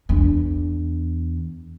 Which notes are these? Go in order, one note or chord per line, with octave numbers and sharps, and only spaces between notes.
E2 D4